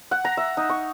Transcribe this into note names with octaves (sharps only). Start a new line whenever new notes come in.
F#5
A#5
E5
D#4
C#6